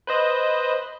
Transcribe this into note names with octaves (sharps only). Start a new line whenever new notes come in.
B4 C5 D#5